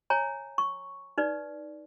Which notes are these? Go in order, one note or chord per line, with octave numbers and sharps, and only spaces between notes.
C#5 G#5 A#5
C#6
D#4 B4 D5